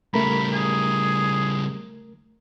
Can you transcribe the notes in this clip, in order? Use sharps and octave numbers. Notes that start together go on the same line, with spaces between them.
C#3 G3 A3 A#4 A#5 B5
G#4